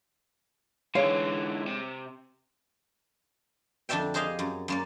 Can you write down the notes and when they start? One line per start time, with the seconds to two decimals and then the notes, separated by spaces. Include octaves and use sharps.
0.95 D3 E3 G#3 C#5 F5
1.67 C3
3.89 F2 D3 D4 D5 E5 G5
4.14 G4 G#4 C5 D#5 F5 G5
4.39 F#2
4.68 F#2 A#3 D5